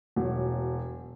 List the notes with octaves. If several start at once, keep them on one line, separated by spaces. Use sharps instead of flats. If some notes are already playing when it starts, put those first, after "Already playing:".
E1 F#3